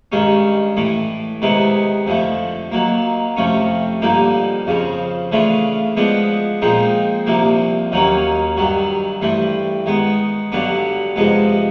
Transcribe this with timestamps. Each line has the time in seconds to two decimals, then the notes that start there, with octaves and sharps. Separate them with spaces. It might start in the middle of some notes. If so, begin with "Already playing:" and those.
0.12 G2 D#3 G#3 C#4
0.77 A2 E3 A3
1.42 C3 D#3 G#3 B3 E4
2.06 F2 D3 F3 A3
2.72 D#3 F#3 A#3
3.36 F2 C3 F3 A3 C#4
4.02 G2 D3 F3 A#3 D#4
4.67 F2 C#3 F3
5.32 C#3 E3 A3 D4 F4
5.97 F3 G#3 B3 D4
6.62 A#2 F3 G#3 C4 D#4
7.26 C2 C3 F3 A#3
7.92 D#2 D#3 F#3 A#3 C#4
8.57 G2 D#3 F#3
9.21 G2 E3 A3 C4
9.86 D#3 G#3 B3
10.52 G2 D3 F#3 B3 D4
11.16 F2 C3 F3 G#3 B3